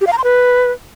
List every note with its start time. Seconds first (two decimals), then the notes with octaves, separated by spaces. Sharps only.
0.01 G4
0.07 F5
0.13 A#5
0.18 C6
0.24 B4